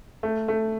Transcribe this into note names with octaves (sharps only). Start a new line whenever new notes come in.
A3
A3